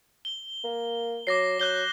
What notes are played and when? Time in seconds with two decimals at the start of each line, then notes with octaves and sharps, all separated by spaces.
0.25 G7
0.64 A#3
1.27 F#3 D6 A#6 C7
1.60 F#3 F#6 G6 G7